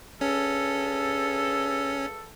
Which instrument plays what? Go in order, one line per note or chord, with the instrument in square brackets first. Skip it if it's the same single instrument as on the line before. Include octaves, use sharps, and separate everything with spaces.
[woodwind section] G2 G#4 A4 [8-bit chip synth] C#4